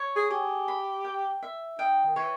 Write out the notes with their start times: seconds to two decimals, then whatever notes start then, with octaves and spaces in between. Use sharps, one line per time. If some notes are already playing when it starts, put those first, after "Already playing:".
Already playing: C#5
0.16 G#4
0.30 G4 G#4
0.68 B5
1.05 G5
1.43 E5
1.79 D#4 G5
2.05 D#3
2.16 E3 C#5